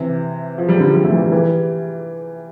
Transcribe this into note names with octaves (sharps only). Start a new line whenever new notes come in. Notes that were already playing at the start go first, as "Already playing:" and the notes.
Already playing: C3 E3
F3
G3
D3 F3
G3
A3
E3 G3
E3 G3